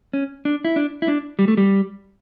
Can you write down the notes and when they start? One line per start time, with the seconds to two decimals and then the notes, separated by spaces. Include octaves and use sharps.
0.13 C#4
0.45 D4
0.65 E4
0.76 D4
1.02 E4
1.08 D4
1.39 G3
1.48 A3
1.57 G3